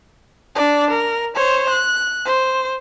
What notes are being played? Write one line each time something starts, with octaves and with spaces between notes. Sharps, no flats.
D4 D5
A#4
C5 C#5
F#6
C5